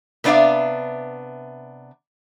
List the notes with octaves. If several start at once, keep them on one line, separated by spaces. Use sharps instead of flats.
C3 B3 D4 D5 E5 F5